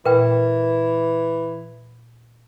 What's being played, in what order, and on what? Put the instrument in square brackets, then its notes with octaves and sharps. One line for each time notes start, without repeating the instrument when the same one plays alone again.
[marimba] A#2 [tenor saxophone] E3 [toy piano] A#4 B4 G5